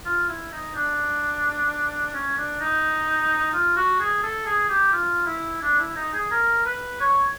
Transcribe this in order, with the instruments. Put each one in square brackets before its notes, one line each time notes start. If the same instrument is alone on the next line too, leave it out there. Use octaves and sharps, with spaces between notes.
[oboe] F4
E4
D#4
D4
C#4
D4
D#4
F4
F#4
G#4
A4
G#4
G4
F4
E4
D4
E4
D#4
G#4
A#4
B4
C#5